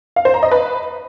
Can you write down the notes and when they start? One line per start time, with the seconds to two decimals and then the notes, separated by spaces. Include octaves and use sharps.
0.16 F5
0.25 C5
0.34 A#5
0.43 D#5
0.51 B4